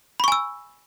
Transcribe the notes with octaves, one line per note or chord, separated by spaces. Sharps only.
G#5 B5 C#6 E6